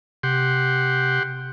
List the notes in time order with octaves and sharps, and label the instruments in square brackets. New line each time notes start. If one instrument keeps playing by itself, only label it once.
[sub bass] C3 [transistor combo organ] G4 F#5 C6